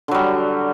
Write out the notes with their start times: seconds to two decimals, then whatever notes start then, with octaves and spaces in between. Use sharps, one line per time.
0.08 D3
0.11 F#3
0.15 G3